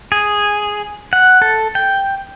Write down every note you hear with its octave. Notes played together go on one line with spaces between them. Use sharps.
G#4
F#5
A4
G5